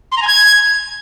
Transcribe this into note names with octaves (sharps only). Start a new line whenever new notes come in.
C6
A#5
G#5
G#6